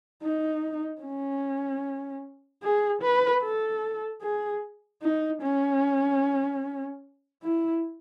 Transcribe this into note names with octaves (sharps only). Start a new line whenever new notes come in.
D#4
C#4
G#4
B4
A4
G#4
D#4
C#4
E4